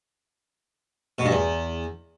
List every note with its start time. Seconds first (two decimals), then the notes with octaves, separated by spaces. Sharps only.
1.18 B2
1.25 G2
1.31 E2